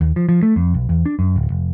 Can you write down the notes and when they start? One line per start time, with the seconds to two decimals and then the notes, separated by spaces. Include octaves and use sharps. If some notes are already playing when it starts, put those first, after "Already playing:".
0.01 D#2
0.16 F3
0.29 F3
0.43 A3
0.56 F2
0.74 B1
0.89 E2
1.06 D4
1.19 F#2
1.36 D1
1.50 F1